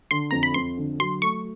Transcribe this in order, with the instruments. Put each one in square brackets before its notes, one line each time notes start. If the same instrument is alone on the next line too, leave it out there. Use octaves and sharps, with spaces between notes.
[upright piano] D3 [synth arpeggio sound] C6
[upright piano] F2 [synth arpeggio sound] A#5
[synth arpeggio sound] B5
[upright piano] F2 [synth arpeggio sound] C6
[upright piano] D3
[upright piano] F#3 [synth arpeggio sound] C6
[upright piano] A3 [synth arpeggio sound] C#6